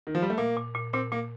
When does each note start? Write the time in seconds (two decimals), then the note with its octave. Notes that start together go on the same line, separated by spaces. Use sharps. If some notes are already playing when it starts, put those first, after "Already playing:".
0.07 D#3
0.15 F3
0.22 G3
0.30 A3
0.38 A#2 A#3
0.57 A#2
0.75 A#2
0.93 A#2 C4
1.12 A#2 A#3